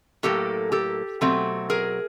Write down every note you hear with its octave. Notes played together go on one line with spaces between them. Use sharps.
A2 F#3 A#3 G4 A4
G4 A4
B2 F#3 A3 C4
G#4 A#4